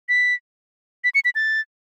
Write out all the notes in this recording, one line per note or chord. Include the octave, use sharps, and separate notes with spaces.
B6
B6
C#7
B6
A6